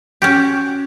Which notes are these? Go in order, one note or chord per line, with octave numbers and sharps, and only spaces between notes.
C#4 F#4 G4